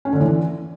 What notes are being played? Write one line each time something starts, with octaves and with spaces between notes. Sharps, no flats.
C#4
D3
E3